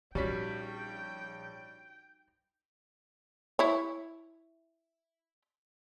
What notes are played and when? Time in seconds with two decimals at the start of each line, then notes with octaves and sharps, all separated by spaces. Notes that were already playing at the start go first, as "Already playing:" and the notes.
0.15 A#1 G3 C#4 D#4 F#4 C#5 G5 B6
3.59 E4 C#5